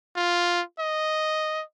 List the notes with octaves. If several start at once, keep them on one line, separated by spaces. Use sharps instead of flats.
F4
D#5